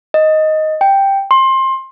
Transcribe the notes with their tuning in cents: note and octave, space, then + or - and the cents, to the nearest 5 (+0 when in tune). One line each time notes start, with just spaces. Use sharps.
D#5 +5
G5 +5
C6 +25